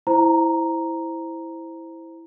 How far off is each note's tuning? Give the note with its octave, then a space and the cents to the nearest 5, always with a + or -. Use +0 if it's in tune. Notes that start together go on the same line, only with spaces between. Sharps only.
E4 +0 C5 +0 A#5 +0